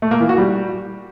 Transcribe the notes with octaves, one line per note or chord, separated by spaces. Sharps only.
A3
A#3
E3
F#4
G3